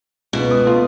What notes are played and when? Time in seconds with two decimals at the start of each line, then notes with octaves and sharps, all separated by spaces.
0.33 C#2 B2
0.51 D#6
0.66 A3 F4